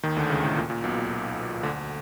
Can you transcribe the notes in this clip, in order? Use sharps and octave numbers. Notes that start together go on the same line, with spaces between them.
D#2 D#3
D2 D3
C#2 C#3
A2
A#2
A#2
B1 B2
A#2
D2 D3